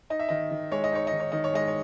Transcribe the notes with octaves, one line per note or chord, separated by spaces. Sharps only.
D#4 D#5
E5
D#3 D#5
D#3
G#3 C#5
D#5
D#4 C#5
D#5
D#3
C#5
D#3 D#5
C#5
G#3 D#5
C#5